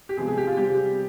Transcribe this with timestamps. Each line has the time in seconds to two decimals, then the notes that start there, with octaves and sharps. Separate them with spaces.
0.09 G4
0.17 C3 F3 G#3 B3 G#4
0.28 G#4
0.38 G4
0.47 F4
0.57 C3 G3 C4 G4